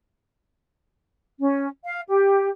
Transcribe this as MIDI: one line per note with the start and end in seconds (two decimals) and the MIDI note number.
1.40 1.67 61
1.84 2.00 77
2.09 2.49 67